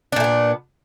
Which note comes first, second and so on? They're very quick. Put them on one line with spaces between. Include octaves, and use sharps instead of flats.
D4 A#2 A3 B3